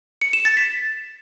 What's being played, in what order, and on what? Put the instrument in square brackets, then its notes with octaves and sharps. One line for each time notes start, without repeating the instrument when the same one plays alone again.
[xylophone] C#7
E7
A6
B6